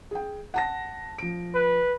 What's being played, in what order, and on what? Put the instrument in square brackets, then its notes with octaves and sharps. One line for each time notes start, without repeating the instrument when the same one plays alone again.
[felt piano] G#4 G5
F#5 A5 A#6
F3 D7
[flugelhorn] B4